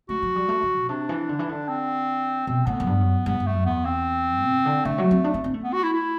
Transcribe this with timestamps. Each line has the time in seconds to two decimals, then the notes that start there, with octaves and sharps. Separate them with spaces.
0.09 A3 F#4
0.22 F#3
0.36 G3
0.49 A3
0.62 G3
0.76 B2
0.89 C3 D4
1.09 E3
1.29 D3
1.39 E3
1.49 D3
1.68 C4
2.47 B2 C4
2.66 A2 B3
2.80 F#2
2.87 G2
3.01 F#2
3.26 G2 B3
3.40 G2
3.47 A3
3.53 F#2
3.66 E2 B3
3.85 C4
4.45 C3
4.65 D3
4.85 D3 A3
4.98 F#3
5.11 C4
5.24 D4
5.34 C4
5.44 C4
5.54 A3
5.64 B3
5.73 F#4
5.83 E4
5.93 E4